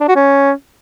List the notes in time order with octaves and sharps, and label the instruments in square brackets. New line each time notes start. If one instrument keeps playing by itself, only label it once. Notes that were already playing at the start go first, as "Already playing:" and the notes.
[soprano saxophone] D4
F#4
C#4